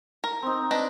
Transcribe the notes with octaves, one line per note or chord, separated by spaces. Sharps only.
A#4
C4 D#4
D4 B4 D#5